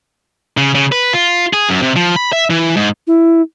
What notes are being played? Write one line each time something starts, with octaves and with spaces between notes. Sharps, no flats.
C#3
C#3
B4
F4
G#4
F#2
C3
F3
B5
E5
E3
G#2
E4